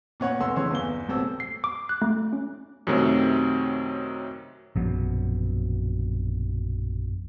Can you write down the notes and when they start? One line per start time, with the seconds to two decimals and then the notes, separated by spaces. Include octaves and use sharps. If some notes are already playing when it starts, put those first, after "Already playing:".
0.20 A#2 B3 C#5 F#5
0.40 F1 A3 F#5 C6 E6
0.56 F2 C#3 E3 C#5 C6 E6
0.71 G1 E2 G7
1.09 A1 B2 C4 A4 E6
1.40 C7
1.64 D6
1.89 F#6
2.02 A3
2.33 C#4
2.87 F#2 C3 D#3 F#3 A3 C4
4.76 A#1 F#2 B2